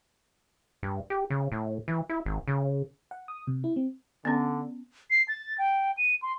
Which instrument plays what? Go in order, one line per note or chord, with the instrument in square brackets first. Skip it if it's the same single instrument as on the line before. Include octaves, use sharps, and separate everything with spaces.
[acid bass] G2
G4
C#3
A2
E3
E4
G#1
C#3
[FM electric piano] F#5
D#6
C3
E4
C4
[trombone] D3 [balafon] B3 C#4
[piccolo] C7
A6
G5
D#7
C6